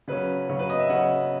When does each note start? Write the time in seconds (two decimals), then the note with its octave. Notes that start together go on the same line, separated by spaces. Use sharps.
0.08 C#3 F#3 C#4 B4
0.49 C#3 F#3 C#4
0.59 B4
0.70 D#5
0.79 E5
0.89 C#3 F#3 C#4 F#5